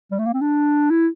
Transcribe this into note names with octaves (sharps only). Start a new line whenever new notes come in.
G3
A3
A#3
C4
D4
E4